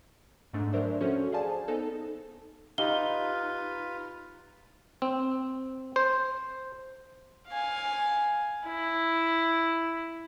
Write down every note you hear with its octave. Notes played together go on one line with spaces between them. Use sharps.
G#2 A3 D4
F#3 D4 A#4 C5 D5 E5
F3 C#4 F#4 A4 C5 C#5
G#4 C5 D5 F5 G#5 A5
B3 D#4 A4
D#4 F4 G4 B4 F5 G7
C4
C5
F5 G#5
E4